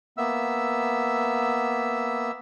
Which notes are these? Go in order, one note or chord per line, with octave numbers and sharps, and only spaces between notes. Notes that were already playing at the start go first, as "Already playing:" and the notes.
A#3 B3 E5 E6